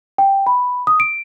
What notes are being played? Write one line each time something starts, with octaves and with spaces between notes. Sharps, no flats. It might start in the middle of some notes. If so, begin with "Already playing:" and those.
G5
B5
D#6
D7